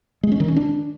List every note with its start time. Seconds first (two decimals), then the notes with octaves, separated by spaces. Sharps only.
0.23 G#3
0.32 C#4
0.40 D#3
0.48 C#4
0.56 D4